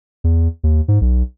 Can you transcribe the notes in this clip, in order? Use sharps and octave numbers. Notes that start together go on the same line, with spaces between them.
E2
D#2
G#2
B1